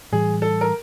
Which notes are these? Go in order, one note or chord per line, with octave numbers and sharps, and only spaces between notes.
A2 E3 G3 G#4
A4
A#4